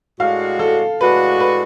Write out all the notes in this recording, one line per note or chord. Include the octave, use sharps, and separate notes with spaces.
A2 G#3 D4 F#4 F5
A4
A2 G#3 D4 F#4 B4
B4